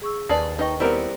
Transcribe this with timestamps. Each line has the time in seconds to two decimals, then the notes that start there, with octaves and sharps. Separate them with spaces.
0.02 G#4 C#6 E6
0.29 D#2 G#4 B4 D5 A5
0.59 D#4 B4 D#5 G5 C#6
0.80 G3 B3 C4 E4 A#4